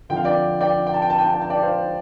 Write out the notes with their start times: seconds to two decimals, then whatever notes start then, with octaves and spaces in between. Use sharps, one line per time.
0.09 F2 D3 F3 G5
0.17 F5
0.25 D5 G5
0.61 D5 G5
0.87 G5
0.94 A5
1.02 G5
1.10 A5
1.18 G5
1.26 A5
1.34 G5
1.42 A5
1.50 D5 G5
1.63 C5 F5